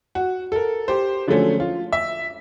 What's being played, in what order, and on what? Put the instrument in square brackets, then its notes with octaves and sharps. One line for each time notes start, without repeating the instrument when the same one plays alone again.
[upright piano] F#4
A4 A#4
G4 C5
D3 F3 F#3 G#3 A3 C#4
F4
E5